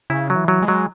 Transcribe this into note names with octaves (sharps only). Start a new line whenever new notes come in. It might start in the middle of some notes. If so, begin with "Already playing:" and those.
C#3 E4
F#3
E3
F#3
G#3
F#3